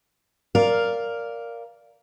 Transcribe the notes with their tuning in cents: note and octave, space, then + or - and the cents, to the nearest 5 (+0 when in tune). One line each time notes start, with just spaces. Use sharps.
A#4 +0 D5 -10 F5 +0